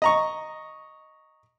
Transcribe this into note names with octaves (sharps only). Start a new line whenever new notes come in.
D#5 A#5 C#6